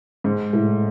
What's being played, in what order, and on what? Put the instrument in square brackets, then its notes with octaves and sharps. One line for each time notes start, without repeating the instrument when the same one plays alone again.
[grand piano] G#2 [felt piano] G#3
[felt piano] A2